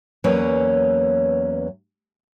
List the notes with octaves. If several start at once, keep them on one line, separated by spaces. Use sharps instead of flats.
E2 F#3 A#3 C#4 B4 C#5